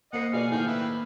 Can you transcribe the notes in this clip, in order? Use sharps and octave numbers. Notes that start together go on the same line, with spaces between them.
A#3 C5 D#5 F#5 C7
B2 F3 G#4 D5 F5
A2 D#3 G#4 F5 G5
E4 B4